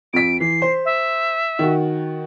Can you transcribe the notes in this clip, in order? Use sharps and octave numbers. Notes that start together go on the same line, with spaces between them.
F2 B6 D7
E3 C7
C5
E5
D#3 F#4